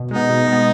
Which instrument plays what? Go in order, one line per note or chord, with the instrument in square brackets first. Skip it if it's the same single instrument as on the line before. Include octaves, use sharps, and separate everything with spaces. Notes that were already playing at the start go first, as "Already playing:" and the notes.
Already playing: [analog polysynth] B2
[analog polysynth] G#3 B3 [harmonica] D#4
[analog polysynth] B2
G#3 B3